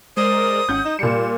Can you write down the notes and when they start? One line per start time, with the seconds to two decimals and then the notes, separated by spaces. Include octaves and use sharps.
0.17 G#3 A#4 C5 D5 D#6
0.69 G#1 C#4 F#5 G6
0.85 D#4 E7
0.99 A#2 G3 C#7